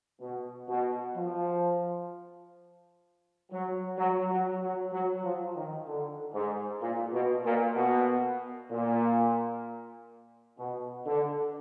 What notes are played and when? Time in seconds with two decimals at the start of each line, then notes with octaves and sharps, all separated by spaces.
0.21 B2
0.68 B2
1.15 F3
3.51 F#3
3.98 F#3
4.30 F#3
4.62 F#3
4.92 F#3
5.24 F3
5.55 D#3
5.86 D3
6.34 G#2
6.81 A#2
7.13 B2
7.44 A#2
7.76 B2
8.71 A#2
10.58 B2
11.06 D3